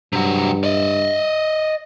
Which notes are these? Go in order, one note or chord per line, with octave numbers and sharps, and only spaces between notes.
G2 C3 F#3
D5 D#5